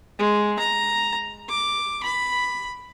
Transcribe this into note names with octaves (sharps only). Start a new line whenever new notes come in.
G#3
A#5
D6
B5